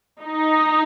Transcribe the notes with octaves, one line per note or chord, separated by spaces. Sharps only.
D#4